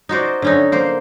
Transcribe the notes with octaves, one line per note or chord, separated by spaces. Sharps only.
D#4 F#4 C5 D5
D3 C#4 D#4
A#3 C5